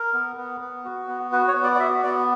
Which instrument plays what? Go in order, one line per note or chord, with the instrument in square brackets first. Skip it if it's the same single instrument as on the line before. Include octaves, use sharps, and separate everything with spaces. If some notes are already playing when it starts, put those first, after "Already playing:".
Already playing: [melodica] A#4
B3
B3
B3
F#4
B3
F#4 B4
C#5
B3
D5
D5
F#4 E5
B3 D5